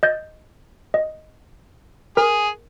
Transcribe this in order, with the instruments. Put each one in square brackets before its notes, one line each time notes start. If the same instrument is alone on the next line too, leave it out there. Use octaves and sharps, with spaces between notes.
[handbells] D#5 G6 A6
D#5
[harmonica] G#4 [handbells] A#4